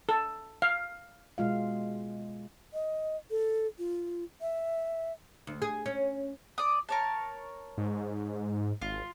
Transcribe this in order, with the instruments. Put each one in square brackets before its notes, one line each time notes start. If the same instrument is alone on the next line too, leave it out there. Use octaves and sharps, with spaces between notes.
[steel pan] A4
F5
[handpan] B2 G#3 F4 F5
[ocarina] D#5
A4
F4
E5
[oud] D2
G#4
C#4
[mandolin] D5 D#6
A#4 C#5 A5
[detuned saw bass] G#2
[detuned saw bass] G#1 [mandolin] F4